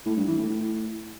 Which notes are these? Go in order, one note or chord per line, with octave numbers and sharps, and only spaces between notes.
A2
G2
E3
A2
A2